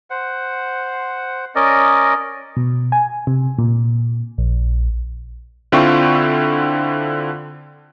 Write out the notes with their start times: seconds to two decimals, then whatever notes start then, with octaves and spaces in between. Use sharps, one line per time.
0.10 C5 F#5
1.55 C#4 A#4 D5 D#5
2.57 B2
2.92 G#5
3.27 C3
3.59 A#2
4.38 A#1
5.72 D3 C4 E4 F4 G5 C#6